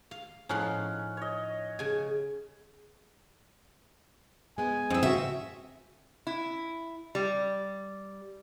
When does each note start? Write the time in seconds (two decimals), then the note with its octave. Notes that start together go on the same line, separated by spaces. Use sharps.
0.11 F5
0.49 A2 F3 C#4 D#4 F#5
1.17 C#5 D#5
1.79 C#3 G#5
4.58 G#3 B3 G#5
4.90 F2 C4 E4 D#6 E6
5.03 C#3 F#4 E5
6.27 E4
7.15 G3